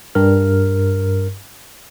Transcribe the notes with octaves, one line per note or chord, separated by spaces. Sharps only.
G2 A#4 F6